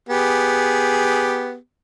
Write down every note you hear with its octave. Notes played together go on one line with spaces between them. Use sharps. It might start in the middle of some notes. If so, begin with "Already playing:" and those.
B3 G4 G#4